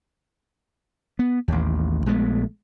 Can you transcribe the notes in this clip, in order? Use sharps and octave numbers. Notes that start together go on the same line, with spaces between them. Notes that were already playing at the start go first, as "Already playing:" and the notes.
B3
A1 D#2
A#1 G#3 A3 B3